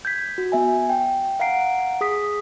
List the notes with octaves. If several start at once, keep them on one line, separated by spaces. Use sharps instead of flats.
G6 G#6 B6
F#4
B3 E5 G#5
G5
F5 F#5 A#5 C7 D7
G#4 D#6 B6